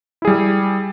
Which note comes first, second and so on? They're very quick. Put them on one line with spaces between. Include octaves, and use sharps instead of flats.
E4 G#4 G3